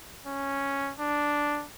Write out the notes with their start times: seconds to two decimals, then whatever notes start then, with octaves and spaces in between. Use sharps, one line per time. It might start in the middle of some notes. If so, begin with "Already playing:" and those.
0.27 C#4
1.00 D4